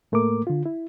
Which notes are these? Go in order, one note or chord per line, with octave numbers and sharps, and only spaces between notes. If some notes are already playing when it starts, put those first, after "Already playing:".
A2 A3 A#3 A#4 D6
D3 F4
E4